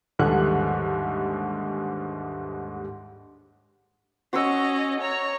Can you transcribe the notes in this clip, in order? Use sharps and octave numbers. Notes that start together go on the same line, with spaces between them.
D#2 G#2 D3 E3 G3 F#6
C#4 F#4 D#5 C#6 E6
C#5 A#5